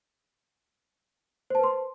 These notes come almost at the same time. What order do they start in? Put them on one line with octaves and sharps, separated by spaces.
C5 A5 B4 C6